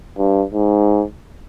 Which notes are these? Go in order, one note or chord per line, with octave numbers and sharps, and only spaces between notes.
G2
G#2